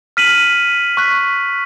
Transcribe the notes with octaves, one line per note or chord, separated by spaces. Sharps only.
F6 B6 D#7 F#7
C#6 F#6 B6